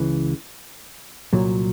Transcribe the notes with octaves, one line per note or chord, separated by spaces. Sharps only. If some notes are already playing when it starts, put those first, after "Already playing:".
Already playing: C#2 C#3 E3
C2 A#2 F#3